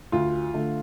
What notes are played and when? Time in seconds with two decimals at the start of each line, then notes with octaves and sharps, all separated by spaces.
0.12 D2 F4
0.54 D3 A3